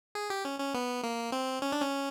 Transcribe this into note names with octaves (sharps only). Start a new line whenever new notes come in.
G#4
G4
C#4
C#4
B3
A#3
C4
C#4
D4
C#4